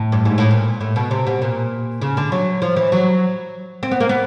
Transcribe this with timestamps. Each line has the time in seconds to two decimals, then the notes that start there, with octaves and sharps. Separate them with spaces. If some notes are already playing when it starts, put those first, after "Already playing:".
Already playing: A2
0.12 G2
0.25 G#2
0.38 A2
0.51 A#2
0.81 A2
0.96 B2
1.11 C3
1.27 B2
1.42 A#2
2.02 C#3
2.17 D3
2.32 F#3
2.62 F3
2.76 E3
2.92 F#3
3.83 C4
3.91 B3
4.00 A#3
4.09 B3